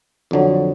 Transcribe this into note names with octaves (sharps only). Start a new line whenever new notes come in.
F2 D3 F#3